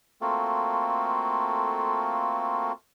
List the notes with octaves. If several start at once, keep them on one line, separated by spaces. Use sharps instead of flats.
A3 A#3 C4 F4 F#4 A4